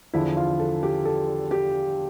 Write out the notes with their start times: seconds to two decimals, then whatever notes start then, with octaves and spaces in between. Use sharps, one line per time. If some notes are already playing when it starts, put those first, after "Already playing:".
0.14 E2 D3 F3 E4
0.37 F4
0.60 A4
0.83 G4
1.05 A4
1.51 G4